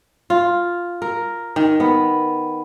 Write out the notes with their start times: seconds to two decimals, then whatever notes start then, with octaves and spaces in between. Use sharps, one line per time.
0.30 F4
1.02 A#4
1.56 D#3
1.80 B3